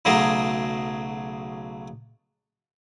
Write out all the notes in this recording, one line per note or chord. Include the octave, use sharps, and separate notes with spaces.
B1 C#3 F#3 A3 G#4 A#5